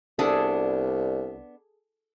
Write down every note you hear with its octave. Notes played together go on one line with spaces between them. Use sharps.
C2 B3 D4 G#4 A4